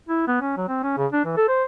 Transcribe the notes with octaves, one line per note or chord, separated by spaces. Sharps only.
E4
B3
C#4
F#3
C4
C#4
C#3
D4
E3
A4
C5